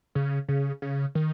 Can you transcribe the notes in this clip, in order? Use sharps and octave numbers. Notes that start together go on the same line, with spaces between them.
C#3
C#3
C#3
D#3